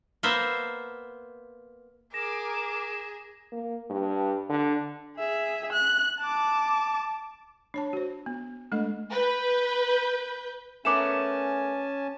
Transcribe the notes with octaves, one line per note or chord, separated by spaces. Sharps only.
A#3 B3 C5 E5
G#4 A#4 D6 A#6 E7
A#3
G2
D3
G#4 E5
F#6
A5 D6
D4 C#5 A5
F#4 C5
B3
G#3 A3 D4 A4 D#5
B4 G6
A3 B3 C#4 A#4 G#5 A5 D6 E7